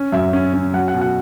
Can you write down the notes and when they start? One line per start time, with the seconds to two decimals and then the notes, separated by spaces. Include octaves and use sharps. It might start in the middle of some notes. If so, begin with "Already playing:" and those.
Already playing: C#4
0.12 F#2 E5
0.33 C#4
0.54 C#4
0.74 F#3 F#5
0.88 F#5
0.94 B2
1.01 F#5